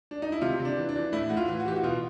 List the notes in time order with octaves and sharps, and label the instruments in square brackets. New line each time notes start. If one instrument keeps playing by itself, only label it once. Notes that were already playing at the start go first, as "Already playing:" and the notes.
[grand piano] D4
D#4
E4
C3 F4
C3
D4
E3
D4
E3
A2 E4
A2 F#4
F4
E3
F#4
E3 G4
F#4
B2 F4